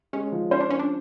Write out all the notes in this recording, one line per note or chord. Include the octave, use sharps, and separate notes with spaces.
G#3 C#4
F3
C#4 C5
D4
C#4 C5
D4